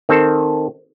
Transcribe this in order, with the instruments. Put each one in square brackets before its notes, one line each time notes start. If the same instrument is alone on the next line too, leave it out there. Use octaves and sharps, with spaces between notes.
[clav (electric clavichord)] D#3 C4 A4